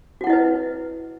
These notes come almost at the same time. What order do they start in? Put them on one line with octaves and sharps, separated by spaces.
F#4 F#5 E4 D#5 B4